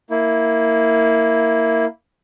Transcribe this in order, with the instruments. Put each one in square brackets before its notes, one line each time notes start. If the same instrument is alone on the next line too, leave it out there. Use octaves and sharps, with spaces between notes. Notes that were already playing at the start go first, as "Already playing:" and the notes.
[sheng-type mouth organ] A#3 E4